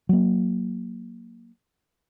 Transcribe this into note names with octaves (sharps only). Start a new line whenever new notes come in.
F#3 A#3